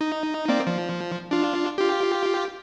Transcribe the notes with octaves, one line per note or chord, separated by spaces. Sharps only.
D#4
A#3 C4 D5
F3
D4 F4
F4 G4